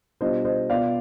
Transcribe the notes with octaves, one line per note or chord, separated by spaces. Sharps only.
B2 G3 D4 F4 C5 D#5
C5 D#5
B2 B3 F4 D5 F5